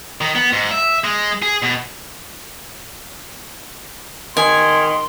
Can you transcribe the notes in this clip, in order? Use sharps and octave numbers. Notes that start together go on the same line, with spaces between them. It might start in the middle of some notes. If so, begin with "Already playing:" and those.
D#3
B3
G#2
E5
G#3
G#4
B2
D#3 G#5 C6